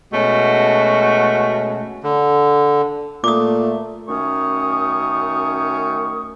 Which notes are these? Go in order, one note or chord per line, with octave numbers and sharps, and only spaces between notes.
B2 G#3 A3 C#4 F#4
D3
A#2 A3 D6 D#6
F#2 D#3 A3 C#4 C#6 D#6